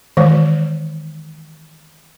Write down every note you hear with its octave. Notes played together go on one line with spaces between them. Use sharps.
D#3 E3 G#3 C5